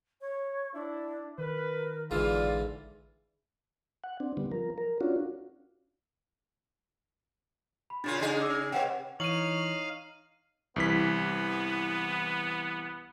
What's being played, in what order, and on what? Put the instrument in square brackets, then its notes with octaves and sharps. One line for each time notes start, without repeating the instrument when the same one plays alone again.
[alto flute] C#5
[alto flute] D4 [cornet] E4
[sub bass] D#3 [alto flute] A#4 [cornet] B4
[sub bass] A1 [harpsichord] G#2 D3 E3 [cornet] F4 [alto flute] D5
[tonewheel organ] F#5
C4 D4
D3 G3 B3
F3 A#4
A#4
C#4 D4 F4 F#4
[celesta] B5
[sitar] A#2 C#3 F4 [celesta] D4 A6
[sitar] C#3 D#4 G#4
[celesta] D6 E6
[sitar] C3 [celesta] B4 F#5 G5
[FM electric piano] E3 [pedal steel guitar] D#4 C#5 [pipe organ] F5 [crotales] D#7 F#7
[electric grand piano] C2 E3 B6 [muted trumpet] B3